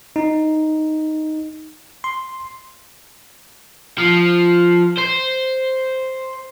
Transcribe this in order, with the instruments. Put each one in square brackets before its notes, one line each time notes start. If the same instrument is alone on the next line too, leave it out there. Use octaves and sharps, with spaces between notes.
[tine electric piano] D#4
C6
[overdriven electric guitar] F3
C5